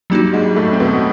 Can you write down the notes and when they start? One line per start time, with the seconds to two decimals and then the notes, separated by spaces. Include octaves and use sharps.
0.10 G2 F#3 G3 A#3 D#4 F#4
0.33 G#2 G#3
0.56 A2 A3
0.73 C4
0.80 B2 B3